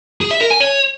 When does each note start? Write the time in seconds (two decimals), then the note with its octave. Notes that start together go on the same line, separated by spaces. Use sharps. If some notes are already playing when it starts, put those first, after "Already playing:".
0.21 G#4
0.31 E5
0.41 A#4
0.50 G#5
0.60 C#5